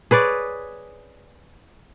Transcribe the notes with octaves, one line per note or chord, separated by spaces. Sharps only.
G#4 B4 C#5 D5